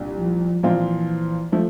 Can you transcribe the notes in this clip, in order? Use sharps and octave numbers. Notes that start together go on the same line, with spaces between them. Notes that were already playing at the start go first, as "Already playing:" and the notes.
Already playing: C2 A#2 G3 D4
F3
A#2 E3 F3 C4 F4
F3 A3